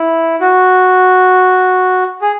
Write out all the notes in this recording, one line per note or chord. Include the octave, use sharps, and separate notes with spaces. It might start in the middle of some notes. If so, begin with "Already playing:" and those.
Already playing: E4
F#4
G#4